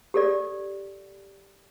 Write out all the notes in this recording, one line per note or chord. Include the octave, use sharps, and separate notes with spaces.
G4 A4 D5